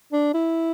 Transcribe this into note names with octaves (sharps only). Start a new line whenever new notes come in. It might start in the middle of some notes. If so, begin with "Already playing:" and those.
D4
E4